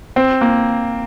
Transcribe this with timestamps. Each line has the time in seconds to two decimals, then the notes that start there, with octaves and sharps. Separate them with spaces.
0.16 C4
0.41 A#3